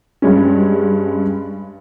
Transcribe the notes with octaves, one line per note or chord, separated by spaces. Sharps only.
G2 G3 G#3 C#4